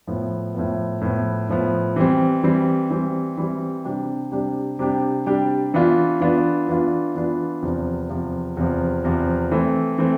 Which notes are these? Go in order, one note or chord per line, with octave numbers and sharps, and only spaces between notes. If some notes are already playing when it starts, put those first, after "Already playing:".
A2 F3 B3
A2 F3 B3
A2 F3 B3
A2 F3 B3
E3 G3 C4
E3 G3 C4
E3 G3 C4
E3 G3 C4
C3 G3 D4 G4
C3 G3 D4 G4
C3 G3 D4 G4
C3 G3 D4 G4
E3 B3 D4 F4
E3 B3 D4 F4
E3 B3 D4 F4
E3 B3 D4 F4
E2 C3 F3
E2 C3 F3
E2 C3 F3
E2 C3 F3
E3 A3 C4
E3 A3 C4